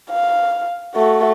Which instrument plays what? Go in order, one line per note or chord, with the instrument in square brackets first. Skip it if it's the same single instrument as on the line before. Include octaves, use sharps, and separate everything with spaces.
[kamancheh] F5
A3 F#4